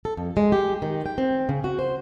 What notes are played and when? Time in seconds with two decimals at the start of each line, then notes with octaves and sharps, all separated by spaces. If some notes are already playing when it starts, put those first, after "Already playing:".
0.05 A4
0.17 F2
0.37 G#3
0.52 G4
0.82 D#3
1.06 G5
1.18 C4
1.49 C#3
1.64 F#4
1.79 C5